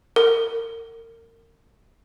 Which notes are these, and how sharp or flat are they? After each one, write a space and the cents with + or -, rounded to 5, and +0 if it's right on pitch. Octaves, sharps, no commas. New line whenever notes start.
A#4 -30